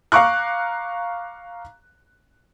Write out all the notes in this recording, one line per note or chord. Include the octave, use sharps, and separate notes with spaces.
F5 A#5 C#6 D6 F#6